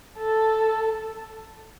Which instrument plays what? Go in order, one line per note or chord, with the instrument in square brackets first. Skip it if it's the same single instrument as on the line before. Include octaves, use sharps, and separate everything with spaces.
[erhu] A4